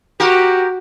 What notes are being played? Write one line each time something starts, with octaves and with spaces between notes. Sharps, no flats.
F#4 G4 A#4